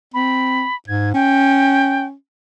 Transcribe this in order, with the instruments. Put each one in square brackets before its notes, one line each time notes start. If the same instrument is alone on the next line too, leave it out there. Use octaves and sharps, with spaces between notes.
[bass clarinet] C4 [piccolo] B5
[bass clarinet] G#2 [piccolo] G#6
[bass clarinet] C#4 [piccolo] G5